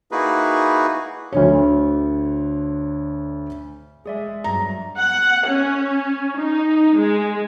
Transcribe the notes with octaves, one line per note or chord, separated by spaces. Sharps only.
A#3 D#4 E4 F#4 G#4 B4
D2 D3 C#5
G#3 G#4 D5 E5
G2 F#3 A#5
F#5
C#4
D#4
G#3